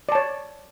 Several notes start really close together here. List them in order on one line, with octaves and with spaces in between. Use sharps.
D5 A5 C#5